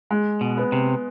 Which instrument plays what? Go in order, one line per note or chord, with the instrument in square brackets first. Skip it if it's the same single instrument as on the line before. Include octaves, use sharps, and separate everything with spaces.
[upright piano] G#3
[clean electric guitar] B2
[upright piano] B3
[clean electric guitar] C3